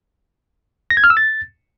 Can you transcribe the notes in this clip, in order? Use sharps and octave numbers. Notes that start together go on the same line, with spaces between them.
A#6
G#6
F6
E6
A6